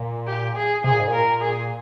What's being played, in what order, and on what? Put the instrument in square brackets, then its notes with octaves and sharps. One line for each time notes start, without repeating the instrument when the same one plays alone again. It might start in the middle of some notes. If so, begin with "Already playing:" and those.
Already playing: [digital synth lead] A#2
[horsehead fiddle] G4
G#4
[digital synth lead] C3 [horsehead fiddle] G#4
[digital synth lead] A#2
G#2
A#2
[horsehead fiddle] A#4
G#4